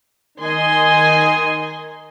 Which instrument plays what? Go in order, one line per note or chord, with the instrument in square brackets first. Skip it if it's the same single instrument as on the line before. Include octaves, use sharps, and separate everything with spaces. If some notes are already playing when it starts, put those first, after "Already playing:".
[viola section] D#3 D#5 G#5 C6